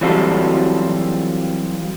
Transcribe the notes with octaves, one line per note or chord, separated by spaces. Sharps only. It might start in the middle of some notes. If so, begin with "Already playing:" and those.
E3 F#3 G3 C4 F4 A4